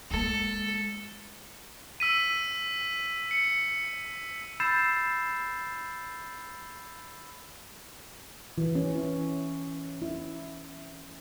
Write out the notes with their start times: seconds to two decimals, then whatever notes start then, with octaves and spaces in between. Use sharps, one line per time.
0.11 G#3 A#3 A4
2.00 E6 B6 D#7
3.31 C#7
4.60 B5 E6 G6 A6 C7 E7
8.58 E3
8.75 C#4
8.95 E4
10.02 E4